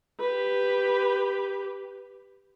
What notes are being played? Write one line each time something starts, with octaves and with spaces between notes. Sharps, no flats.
G4 B4